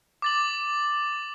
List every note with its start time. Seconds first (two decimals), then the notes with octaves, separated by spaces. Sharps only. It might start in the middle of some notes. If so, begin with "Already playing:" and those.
0.22 D6 A6 F#7